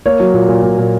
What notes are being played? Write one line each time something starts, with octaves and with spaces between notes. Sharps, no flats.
A#3 C#5
F#3
A#2
A#2
A#2
A#2